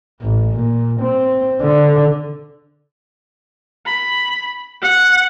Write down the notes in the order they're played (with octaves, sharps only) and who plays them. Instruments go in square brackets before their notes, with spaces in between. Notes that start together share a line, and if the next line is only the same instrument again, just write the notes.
[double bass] A1
A#2
C4
D3
[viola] B5
F#5